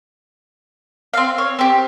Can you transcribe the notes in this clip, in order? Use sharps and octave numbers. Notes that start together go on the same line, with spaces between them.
C4 F5
C#5
C4 G4